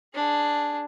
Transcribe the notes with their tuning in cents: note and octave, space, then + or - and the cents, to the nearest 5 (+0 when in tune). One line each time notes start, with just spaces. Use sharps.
D4 +0 G#4 +0